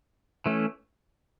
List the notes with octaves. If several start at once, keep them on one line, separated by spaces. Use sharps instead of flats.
E3 A3 C#4